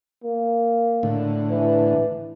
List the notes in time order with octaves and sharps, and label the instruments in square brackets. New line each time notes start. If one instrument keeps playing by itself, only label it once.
[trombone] A#3
[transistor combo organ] A2 D3
[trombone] E3